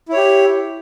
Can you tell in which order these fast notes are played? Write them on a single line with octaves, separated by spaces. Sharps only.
E4 C#5 G4